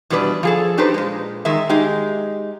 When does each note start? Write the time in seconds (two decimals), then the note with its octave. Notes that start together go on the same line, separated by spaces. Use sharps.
0.10 E2 B2 G3 D4 B4 D5
0.43 F3 G#4 A4
0.78 D4 D#4 G4 A4 B4 C5
0.94 A#2 G#3
1.45 D#3 G#3 A#4 E5
1.69 G#3 D#4 G4